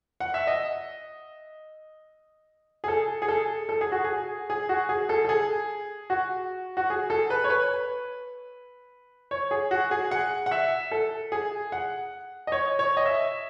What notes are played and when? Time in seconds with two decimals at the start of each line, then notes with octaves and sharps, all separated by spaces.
0.20 F#5
0.34 E5
0.47 D#5
2.84 G#4
2.88 A4
3.22 G#4
3.28 A4
3.69 A4
3.81 G#4
3.92 F#4
4.04 G#4
4.50 G#4
4.69 F#4
4.89 G#4
5.09 A4
5.25 A4
5.29 G#4
6.10 F#4
6.77 F#4
6.90 G#4
7.10 A4
7.30 B4
7.44 C#5
7.50 B4
9.31 C#5
9.51 G#4
9.71 F#4
9.91 G#4
10.11 F#5
10.46 F#5
10.51 E5
10.91 A4
11.32 G#4
11.72 F#5
12.47 D#5
12.52 C#5
12.79 C#5
12.97 D#5
13.06 E5